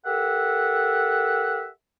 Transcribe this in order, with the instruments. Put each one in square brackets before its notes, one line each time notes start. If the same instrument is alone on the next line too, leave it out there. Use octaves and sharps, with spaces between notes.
[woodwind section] G4 A4 A#4 E5 F#5